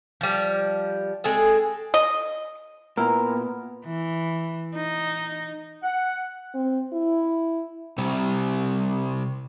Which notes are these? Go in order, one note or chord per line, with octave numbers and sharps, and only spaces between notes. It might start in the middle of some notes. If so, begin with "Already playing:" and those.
F3 G3
G#3 C4 G#4 A4
D#5
A#2 B3 E4 A#4 A#5
E3
D#4
F#5
C4
E4
C3 G3